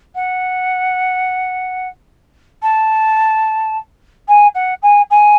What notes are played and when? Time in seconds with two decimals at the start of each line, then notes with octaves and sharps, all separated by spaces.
0.15 F#5
2.62 A5
4.28 G#5
4.55 F#5
4.82 G#5
5.10 G#5